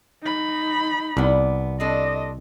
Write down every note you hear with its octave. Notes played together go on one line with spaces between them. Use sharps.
D#4 B5
C2 B3 D5
C4 D4 A4 D#5